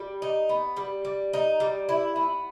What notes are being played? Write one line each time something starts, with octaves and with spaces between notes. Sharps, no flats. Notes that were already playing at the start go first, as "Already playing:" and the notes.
Already playing: G3
D#4
B3
G3
G3
D#4
G3
E4
B3